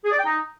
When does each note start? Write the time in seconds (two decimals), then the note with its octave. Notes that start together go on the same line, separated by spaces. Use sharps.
0.04 G#4
0.11 D5
0.18 G5
0.25 D#4